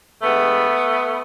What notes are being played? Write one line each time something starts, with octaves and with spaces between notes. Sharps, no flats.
G2 E3 G#3 A3 B3